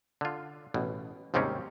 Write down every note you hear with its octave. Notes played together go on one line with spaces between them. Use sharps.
D3 F4
A1 B2
D#2 G#2 C3 G3 C4 C#4